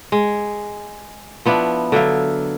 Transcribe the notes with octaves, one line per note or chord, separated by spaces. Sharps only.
G#3
F3 B3 D4 E4
D3 F#3 E5 F5